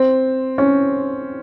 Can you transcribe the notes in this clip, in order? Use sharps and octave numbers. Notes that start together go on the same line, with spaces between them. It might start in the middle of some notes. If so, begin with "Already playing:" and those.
Already playing: C4
C#4